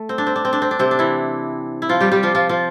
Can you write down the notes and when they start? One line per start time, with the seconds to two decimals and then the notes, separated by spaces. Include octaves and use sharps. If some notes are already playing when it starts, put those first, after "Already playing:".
Already playing: A3
0.09 C4
0.18 D4
0.27 C4
0.36 D4
0.45 C4
0.53 D4
0.62 C4
0.71 D4
0.79 C3 C4
0.91 D4
0.99 E3 E4
1.82 E4
1.89 F3 F4
2.01 G3 G4
2.12 G3 G4
2.23 F3 F4
2.35 F3 F4
2.49 F3 F4